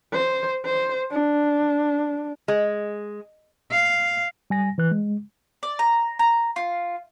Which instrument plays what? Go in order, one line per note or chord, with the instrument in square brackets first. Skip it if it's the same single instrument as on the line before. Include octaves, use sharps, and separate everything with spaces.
[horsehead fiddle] C5
C5
D4
[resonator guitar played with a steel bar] G#3
[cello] F5
[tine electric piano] G3 G#5 A#6
E3 B4 F#6
G#3
[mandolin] D5
A#5
A#5
F4